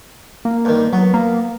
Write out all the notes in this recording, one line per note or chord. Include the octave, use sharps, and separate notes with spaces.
A#3
G2 D#3
F#3 B3
A#3